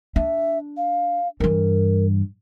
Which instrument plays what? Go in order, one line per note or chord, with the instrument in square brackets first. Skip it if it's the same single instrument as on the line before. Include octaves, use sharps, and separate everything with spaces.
[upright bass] D4 [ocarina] E5
[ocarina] F5
[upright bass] G2 E3 [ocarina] A#4